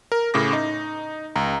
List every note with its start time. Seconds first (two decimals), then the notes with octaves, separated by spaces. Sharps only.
0.12 A#4
0.34 A2 C#3 D6 A#6
0.53 D#4
1.36 C#2 A#5